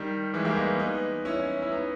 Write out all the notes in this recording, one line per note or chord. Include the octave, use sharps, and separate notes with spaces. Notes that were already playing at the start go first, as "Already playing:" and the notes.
Already playing: D#3 G3
E3 G#3
G3 A#3
G#3 B3
B3 D#4
C#4 E4
E4
B3 D#4